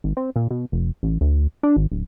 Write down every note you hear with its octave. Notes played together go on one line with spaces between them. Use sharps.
G#1
C4
A#2
B2
F1
A1
D2
D4
G#1
D1